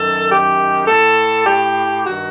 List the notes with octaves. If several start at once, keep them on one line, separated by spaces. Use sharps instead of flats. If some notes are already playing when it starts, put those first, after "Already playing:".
Already playing: F#2 D#3 A4
G4
A2 A4
G4
G2 D#3 F#4